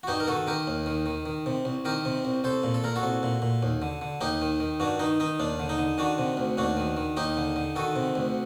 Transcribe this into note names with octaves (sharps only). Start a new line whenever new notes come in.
F#4
G2 D#4 G4
A#4
D#3 F#4 A4
D#3 G4 A#4
D#2
D#3
D#3
D#3
C3
C2
D#3 G4 A#4
C3
C2
C2 A4 C5
A#2
A4
A#2 A#4
F#4 A4
C2
A#2
A#2
D#2
D3
D3
D#2 D#4 G4
D#3
D#3
G2 D4 F#4
D#3 D#4
D#3 D#4
D#2 D4
D3
D#4
D3
D#3 D4 F#4
C3
D2
D#2 D4 F#4
D#3
D#3
D#2 D#4 G4
D3
D3
D#3 F#4 A4
C3
D2